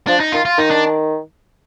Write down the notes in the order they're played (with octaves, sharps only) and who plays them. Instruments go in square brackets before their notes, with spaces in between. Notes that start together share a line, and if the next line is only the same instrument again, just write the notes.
[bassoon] F3 [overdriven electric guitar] D4
[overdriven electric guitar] D#4
[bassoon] D#3 [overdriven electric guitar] F4
[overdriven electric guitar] F4
[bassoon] D#3 [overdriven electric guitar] D#4
[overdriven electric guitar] D4